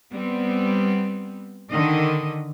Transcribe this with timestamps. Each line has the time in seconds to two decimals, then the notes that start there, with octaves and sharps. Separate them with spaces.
0.11 G3 B3 C4
1.70 D3 D#3 D#5